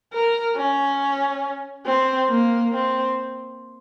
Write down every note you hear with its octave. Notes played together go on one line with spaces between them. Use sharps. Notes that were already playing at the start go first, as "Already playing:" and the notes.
A#4
C#4
C4
A#3
C4